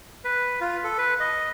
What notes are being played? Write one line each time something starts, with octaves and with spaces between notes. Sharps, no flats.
B4
F4
A4
B4
D#5